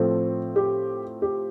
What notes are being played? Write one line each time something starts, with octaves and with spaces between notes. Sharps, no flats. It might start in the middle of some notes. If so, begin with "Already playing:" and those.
Already playing: A2 F3 C4 A4
G4
G4